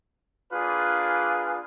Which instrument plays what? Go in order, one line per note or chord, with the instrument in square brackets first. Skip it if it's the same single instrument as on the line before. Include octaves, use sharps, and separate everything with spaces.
[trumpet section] A#3 D4 F4 G#4 B4